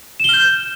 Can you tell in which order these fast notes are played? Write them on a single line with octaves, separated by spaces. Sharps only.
E7 G7 F6 G6